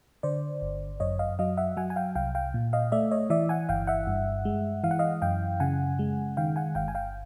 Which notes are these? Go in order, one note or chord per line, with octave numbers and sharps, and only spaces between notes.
D3 C5 D5
G1
F#2 C#5 D#5
D#5 F5
F#3 D#5 F5
E5 F#5
F#3 F#5 G#5
G#5
F5 G5
C2 F5 G5
F5 G5
A#2
D#5 F5
A3 D5 E5
C#5 D#5
E3 D5 E5
F#5 G#5
G1 F5 G5
E5 F#5
G2
G#3
E3 F5
F#5
D#5 F5
F#2 F5 G5
C#3 F#5 G#5
G#3
D#3 F5 G5
F#5 G#5
G1 F5 G5
G#5
F5 G5